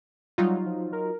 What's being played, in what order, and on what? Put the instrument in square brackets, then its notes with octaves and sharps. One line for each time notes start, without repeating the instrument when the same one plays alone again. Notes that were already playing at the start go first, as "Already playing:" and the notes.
[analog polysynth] F#3 D#4 F4 [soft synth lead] G3
[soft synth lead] F3
A#4